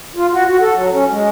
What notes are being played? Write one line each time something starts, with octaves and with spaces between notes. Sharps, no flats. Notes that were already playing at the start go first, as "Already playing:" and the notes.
F4
F#4
F#4
A4
F#3
C#4
G#3